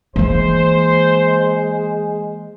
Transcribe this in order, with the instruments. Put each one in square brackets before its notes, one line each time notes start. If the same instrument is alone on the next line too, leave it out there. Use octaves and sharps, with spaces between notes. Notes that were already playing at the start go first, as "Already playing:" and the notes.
[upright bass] E3 A#3 [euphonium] G#3 [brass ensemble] C5